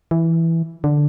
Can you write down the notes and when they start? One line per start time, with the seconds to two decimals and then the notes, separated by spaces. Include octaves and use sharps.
0.11 E3
0.84 D3